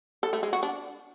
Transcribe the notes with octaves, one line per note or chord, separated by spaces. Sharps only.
A4
A3
G#3
F#4
D4